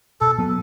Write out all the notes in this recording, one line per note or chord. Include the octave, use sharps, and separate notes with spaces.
B2 A4
F#3 B3